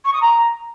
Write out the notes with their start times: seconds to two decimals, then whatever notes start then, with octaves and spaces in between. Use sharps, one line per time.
0.05 C#6
0.13 D#6
0.21 A#5